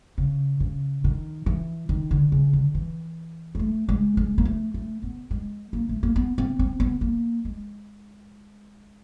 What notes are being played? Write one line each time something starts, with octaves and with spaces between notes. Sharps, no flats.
C#3
C#3
D#3
E3
D#3
D3
C#3
D3
E3
G#3
A3
G#3
G#3
A#3
A3
A3
B3
G#3
A#3
A3
A#3
B3
C4
C4
B3
A#3
G#3